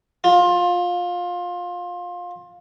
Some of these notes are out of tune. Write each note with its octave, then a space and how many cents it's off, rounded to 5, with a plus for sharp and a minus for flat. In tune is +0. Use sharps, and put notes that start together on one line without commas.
F4 +20